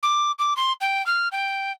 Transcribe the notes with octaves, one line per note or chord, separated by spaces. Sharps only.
D6
D6
C6
G5
F6
G5